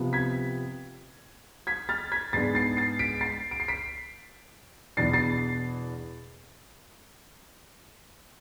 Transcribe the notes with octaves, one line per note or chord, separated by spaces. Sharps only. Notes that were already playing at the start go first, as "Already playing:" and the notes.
Already playing: C3 F3 B3
G#6 B6
G#6 B6
F6 A6
G#6 B6
G#2 G#3 B3 D4 A6 C7
A6 C7
A6 C7
B6 D7
A6 C7
D7
C7
B6 D7
E2 B2 B3 D4 A6 C7
A6 C7